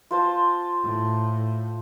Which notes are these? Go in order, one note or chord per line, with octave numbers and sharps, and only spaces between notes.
F4 C5 A5
A2